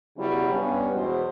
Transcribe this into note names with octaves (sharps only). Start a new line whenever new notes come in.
C#3 F#3 G3 B3 C#4 E4
G2 B3 C#4
E2 B2 F#3 G#3 C5